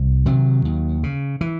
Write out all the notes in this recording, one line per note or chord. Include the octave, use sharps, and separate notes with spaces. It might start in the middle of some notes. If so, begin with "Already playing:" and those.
Already playing: C2
C3 D#3 F#3
D#2
C#3
E3